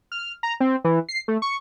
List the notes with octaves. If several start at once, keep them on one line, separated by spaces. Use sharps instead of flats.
F6
A#5
C4
E3
C7
A3
C#6